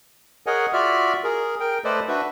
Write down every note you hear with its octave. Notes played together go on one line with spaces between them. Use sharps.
G#4 A#4 C#5 D#5 F#5 G#5
F4 F#4 D5 E5 F6
G#4 A#4
A#4 G5
A3 A4 B4 C5 D5 D#5
D4 F#4 B4 E5